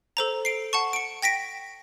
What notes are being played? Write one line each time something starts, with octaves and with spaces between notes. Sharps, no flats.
A4 C5 A#5
C7 D7
F#5 A5 C#6
C#7 D7
G5 A#6 B6 D7